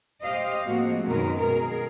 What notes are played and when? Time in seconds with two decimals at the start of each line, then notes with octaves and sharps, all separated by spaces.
0.23 G4 C5 D#5 F5
0.65 A2 F3 G#3 A#3 C4 F#4
1.07 F#2 B2 D#3 G#3 A#4 B4
1.37 B2 G#4 A#4